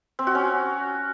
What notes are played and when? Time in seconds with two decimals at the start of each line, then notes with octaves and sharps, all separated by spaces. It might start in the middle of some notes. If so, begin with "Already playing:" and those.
0.19 C4
0.27 F#4
0.35 C#4